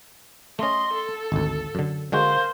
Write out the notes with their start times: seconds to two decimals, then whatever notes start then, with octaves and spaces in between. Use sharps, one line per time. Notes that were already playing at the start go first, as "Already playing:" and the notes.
0.59 A3 C#4 D#5 C6
0.93 A4
1.32 G#1 D2
1.75 F#2 D3
2.12 D3 G#3 A#3 F#4 C5